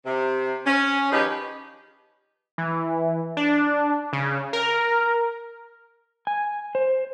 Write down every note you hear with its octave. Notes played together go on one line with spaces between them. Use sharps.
C3
C#4
D#3 F3 D#4 G4 G#4 B4
E3
D4
C#3
A#4
G#5
C5